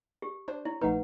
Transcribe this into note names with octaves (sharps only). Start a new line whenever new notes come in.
G4
D4 C5
E4 C#5
A#1 A3 D#4 B4 F#5